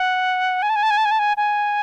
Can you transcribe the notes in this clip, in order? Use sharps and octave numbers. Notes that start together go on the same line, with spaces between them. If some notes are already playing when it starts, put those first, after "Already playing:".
Already playing: F#5
G#5
A5
G#5
A5
G#5
A5
G#5
A5
G#5
G#5